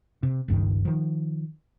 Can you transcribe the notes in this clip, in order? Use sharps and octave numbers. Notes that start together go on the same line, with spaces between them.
C3
G1 C#2 G2 D#3
D#3 F3